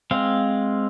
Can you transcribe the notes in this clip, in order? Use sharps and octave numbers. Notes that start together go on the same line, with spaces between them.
G#3 C4 F5